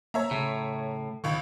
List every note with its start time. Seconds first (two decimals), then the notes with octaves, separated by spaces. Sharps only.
0.14 A#3 C#5 E5 A#5
0.31 A2 C#3
1.24 G#1 C#2 D#3 C#6